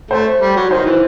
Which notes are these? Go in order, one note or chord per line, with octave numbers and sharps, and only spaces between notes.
A3 C5
G3
F#3
D#3 C5
E3